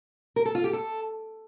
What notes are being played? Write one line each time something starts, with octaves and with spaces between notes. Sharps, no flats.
A#4
A4
F4
G4
A4